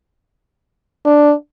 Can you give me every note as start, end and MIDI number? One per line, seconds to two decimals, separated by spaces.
1.06 1.34 62